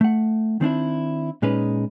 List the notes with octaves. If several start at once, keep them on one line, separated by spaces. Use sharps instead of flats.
A3 F#5
D#3 C4 D4 E4
A#2 G#3 C#4 D#4 B4